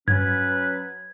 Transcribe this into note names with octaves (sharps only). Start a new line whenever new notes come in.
G2 F#3 C#4 B4 G#6